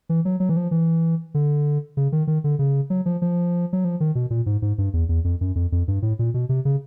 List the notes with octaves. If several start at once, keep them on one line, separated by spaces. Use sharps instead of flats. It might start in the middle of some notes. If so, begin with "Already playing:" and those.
E3
F#3
F#3
E3
F3
E3
D3
C#3
D#3
D#3
D3
C#3
F#3
F3
F3
F#3
F3
D#3
B2
A#2
G#2
G#2
G2
E2
E2
F2
F#2
F2
F2
G2
A2
A#2
B2
C3
C#3